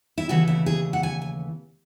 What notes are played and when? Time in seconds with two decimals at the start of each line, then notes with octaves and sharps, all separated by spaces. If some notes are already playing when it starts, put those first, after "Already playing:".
0.18 E4
0.29 D#2 C#3 E3 A3 F#4
0.48 E4
0.66 G#4
0.93 F#5
1.03 G#5
1.22 G#5